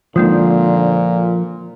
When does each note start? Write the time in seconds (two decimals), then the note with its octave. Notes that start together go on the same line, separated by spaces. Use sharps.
0.16 A#2 D3 F3 G#3 A#3 D#4